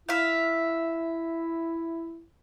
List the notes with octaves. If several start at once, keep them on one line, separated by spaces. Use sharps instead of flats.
E4 E5 F5